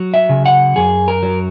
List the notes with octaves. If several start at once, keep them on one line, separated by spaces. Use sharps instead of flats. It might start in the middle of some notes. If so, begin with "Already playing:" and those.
Already playing: F#3
E5
C#3
F#5
F#2 G#4
A#4
F#3